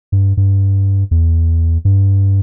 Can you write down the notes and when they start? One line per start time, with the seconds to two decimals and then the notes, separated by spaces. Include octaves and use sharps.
0.12 G2
0.37 G2
1.11 E2
1.85 G2